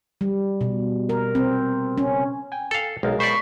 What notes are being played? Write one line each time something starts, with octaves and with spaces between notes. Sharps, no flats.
G3
B2
A#4
C4
C#4
G5 G#5
A4 F5
B1 G#3 A#4 F5
C5 D5 B5 C#6